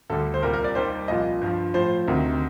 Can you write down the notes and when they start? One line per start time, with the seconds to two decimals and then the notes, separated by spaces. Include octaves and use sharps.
0.10 D2 D3 G3 A4
0.34 C5
0.43 C2 A#2 G3 A#4
0.53 A#4
0.64 D5
0.75 D#2 D#3 G3 C5
1.08 C2 A#2 F3 D#5
1.41 G2 F3
1.74 A2 F3 C5
2.08 D2 C3 D#3